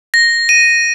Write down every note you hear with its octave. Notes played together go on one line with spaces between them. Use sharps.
A#6
D#7